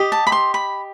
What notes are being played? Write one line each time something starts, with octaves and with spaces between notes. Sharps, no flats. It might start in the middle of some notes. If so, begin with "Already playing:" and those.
Already playing: G4 D#5
A5
B5
C6
B5